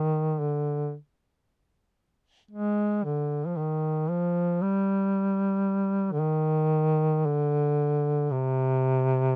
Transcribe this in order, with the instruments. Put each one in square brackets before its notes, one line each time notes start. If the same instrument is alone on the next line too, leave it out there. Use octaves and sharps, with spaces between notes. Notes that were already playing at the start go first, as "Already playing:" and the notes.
Already playing: [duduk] D#3
D3
G#3
D3
F3
D#3
F3
G3
D3
D#3
D3
C3